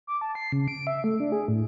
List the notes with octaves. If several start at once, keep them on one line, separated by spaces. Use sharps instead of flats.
D6
A5
C7
C#3
D7
E5
A3
D4
G#4
A2